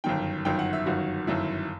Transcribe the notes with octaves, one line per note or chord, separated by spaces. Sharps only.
G1 F#2 D#3 G5
G1 F#2 D#3 G5
F#5
E5
G1 F#2 D#3 F#4
G1 F#2 D#3 E4